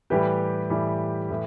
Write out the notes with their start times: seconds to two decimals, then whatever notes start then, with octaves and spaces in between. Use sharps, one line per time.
0.10 A2 E3 G3 G4 B4
0.70 A2 E3 G3
1.30 A2 E3